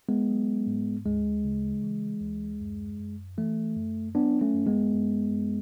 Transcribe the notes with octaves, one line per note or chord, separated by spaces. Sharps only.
G#3 B3
F#3
G#2
D2 G#3
C#3
E3
D2
F#2
F#2
E3 A3
F#2
F#3 B3 D4
A3 C#4
F#2
G#3 B3
F#2
F#2